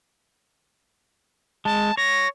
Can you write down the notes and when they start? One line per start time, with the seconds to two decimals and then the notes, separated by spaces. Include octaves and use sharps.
1.65 G#3 A5
1.97 C#5 A#6